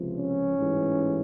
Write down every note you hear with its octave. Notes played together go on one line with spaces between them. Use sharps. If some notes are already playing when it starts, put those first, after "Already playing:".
Already playing: C#2 C3 F3
C#4
A1 G#2 E3